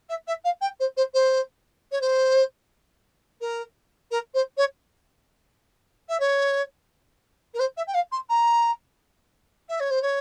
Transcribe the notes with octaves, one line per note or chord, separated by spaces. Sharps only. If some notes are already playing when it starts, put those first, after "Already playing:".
E5
E5
F5
G5
C5
C5
C5
C#5
C5
A#4
A#4
C5
C#5
E5
C#5
A#4
C5
E5
G5
F5
C6
A#5
E5
C#5
C5
C#5